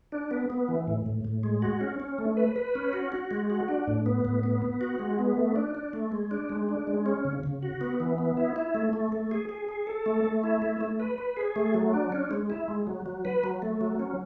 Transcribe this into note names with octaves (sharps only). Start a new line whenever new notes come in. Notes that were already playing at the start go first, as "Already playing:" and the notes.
D4
B3
B3
E3
A2
A2
A2
G#3
F#4
C#4
C#4
A3
B4
B4
C#4
F#4
F#4
G#3
F#4
D4
A2
B3
A2
B3
B3
F#4
G#3
B3
A3
D4
D4
A3
G#3
D4
G#3
D4
G#3
C#4
C#3
C#3
F#4
B3
E3
B3
E4
E4
A3
A3
A3
G#4
G#4
G#4
A4
A3
A3
E4
A3
A3
B4
B4
G#4
A3
F#3
D4
C#4
G#3
E4
G#3
F#3
F#3
B4
F#3
A3
F#3
C#4